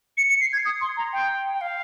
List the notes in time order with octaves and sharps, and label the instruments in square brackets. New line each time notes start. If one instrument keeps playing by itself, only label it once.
[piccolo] C#7
C#7
C7
G#6
D#6
C6
A#5
G5
G5
F5